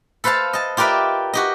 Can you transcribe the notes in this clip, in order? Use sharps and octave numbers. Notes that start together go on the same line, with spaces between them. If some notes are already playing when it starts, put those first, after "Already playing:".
A4 B4 C5 F5 A5
D#5 A5
F4 G4 A#4 B4 D5 E5
F#4 G4 D#5